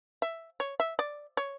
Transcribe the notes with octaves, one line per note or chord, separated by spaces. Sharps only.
E5
C#5
E5
D5
C#5